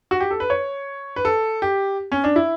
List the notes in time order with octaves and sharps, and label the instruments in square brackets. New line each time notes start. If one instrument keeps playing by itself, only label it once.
[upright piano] F#4
G4
A4
B4
C#5
B4
A4
G4
C#4
D4
E4